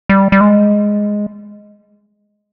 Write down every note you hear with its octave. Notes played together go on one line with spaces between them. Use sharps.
G3
G3
G#3